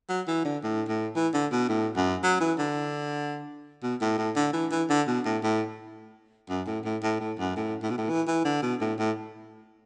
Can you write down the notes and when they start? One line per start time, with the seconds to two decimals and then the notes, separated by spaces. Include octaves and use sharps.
0.09 F#3
0.28 E3
0.45 D3
0.63 A2
0.89 A2
1.15 E3
1.34 D3
1.52 B2
1.69 A2
1.96 F#2
2.23 F#3
2.40 E3
2.58 D3
3.83 B2
4.01 A2
4.18 A2
4.36 D3
4.53 E3
4.71 E3
4.89 D3
5.07 B2
5.25 A2
5.43 A2
6.49 F#2
6.67 A2
6.84 A2
7.03 A2
7.20 A2
7.39 F#2
7.56 A2
7.82 A2
7.90 B2
7.98 A2
8.09 E3
8.27 E3
8.45 D3
8.62 B2
8.81 A2
8.99 A2